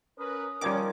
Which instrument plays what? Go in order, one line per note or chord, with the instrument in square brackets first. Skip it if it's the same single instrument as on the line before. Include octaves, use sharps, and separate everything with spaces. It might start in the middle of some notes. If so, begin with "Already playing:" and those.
[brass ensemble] C#4 A#4 B4 [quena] D#6
[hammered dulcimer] D#3 F3 G#5 [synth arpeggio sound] G3 D6 [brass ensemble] C#4